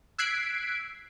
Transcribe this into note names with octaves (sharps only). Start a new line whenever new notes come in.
E6 F#6 G#6 B6 C7 D7